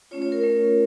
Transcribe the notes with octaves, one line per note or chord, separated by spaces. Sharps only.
A3 C#4 F4 C#5
C#5
A#4
A3 C#4 F4